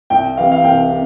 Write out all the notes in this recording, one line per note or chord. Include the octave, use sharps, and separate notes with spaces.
C2 G5
C3 E3 G3 F5
F5
C2 G5
C3